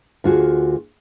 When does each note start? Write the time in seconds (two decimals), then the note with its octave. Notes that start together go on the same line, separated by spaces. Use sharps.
0.24 D2 F4 F#4 G#4